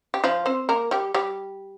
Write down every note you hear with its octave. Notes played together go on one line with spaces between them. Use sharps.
G4
F3 F4
C4 C5
A#3 A#4
G3 G4
G3 G4